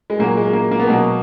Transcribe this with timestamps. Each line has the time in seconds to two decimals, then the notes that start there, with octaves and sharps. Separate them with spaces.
0.10 G#3
0.19 A#2 F#3 A#3
0.37 G#3
0.53 A#3
0.71 A#3
0.80 B3
0.88 B2 F#3 A#3